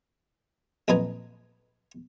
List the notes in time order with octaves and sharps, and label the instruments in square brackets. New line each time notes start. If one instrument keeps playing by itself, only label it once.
[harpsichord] A#1 F2 B4 D#5 G#5 A#5